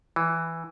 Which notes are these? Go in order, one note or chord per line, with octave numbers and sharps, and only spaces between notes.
E3